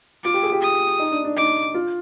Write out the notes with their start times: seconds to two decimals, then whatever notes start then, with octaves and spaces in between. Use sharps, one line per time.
0.24 F4 D6
0.34 G4
0.43 G#4
0.52 G4
0.62 D#6
0.99 D#4
1.12 D4
1.25 D4
1.37 D#4 D6
1.74 F4